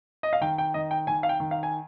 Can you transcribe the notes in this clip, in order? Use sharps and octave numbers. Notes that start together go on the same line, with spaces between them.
D#5
F5
D#3 G5
G5
D#3 D#5
G5
D#3 G#5
F5
G5
D#3
F5
G#5